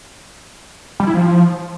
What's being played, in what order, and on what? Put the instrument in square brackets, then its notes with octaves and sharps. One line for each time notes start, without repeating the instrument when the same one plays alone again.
[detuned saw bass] G3
E4
F3